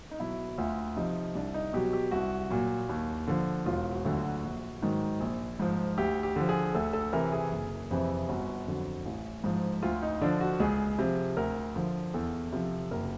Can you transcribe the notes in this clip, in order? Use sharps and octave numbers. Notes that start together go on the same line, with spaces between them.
D#4
B2 F#3 E4
D2 F4
C3 F3 D#4
C2 D4
D#4
B2 F#3 G4
G4
C2 F#4
A#2 F#3
D#2
D3 F3
E1 F4
F#4
D2 D3 F#3
F#4
A#1
G#2 D#3 F#3
A#1
G#2 F3
D2 G4
G4
D3 F3
G#4
D2 A4
A4
C3 E3 A#4
G#4
F#1
F2 C3 E3
G1 F#4
F2 D3 F#3
A1
G#2 F3
D2 F4
D#4
D3 F3 D4
F#4
C#2 G#4
C3 F3
D2 A#4
D3 F3
E2 A4
C3 F3
F#1 A#4